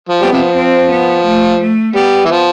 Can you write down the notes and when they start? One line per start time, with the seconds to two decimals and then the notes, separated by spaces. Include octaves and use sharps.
0.09 F3
0.20 G3 B3
0.32 C3 F3
0.55 C4
0.90 B3
1.25 A3
1.60 A3
1.95 G3 B3
2.25 E3
2.30 F3